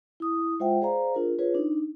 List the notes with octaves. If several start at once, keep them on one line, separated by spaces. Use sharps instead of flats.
E4 D#6
G#3 F4 C5 E5 F#5 G5
G#4 C5 D5 F5 A#5
D4 F4 G#4 A#4
F4 G#4 B4 C#5
D4 D#4